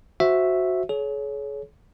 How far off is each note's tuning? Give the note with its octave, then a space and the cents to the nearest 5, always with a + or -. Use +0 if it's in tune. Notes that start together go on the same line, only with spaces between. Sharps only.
F#4 -5 C5 +0 E5 +0
G#4 +45 C#5 +15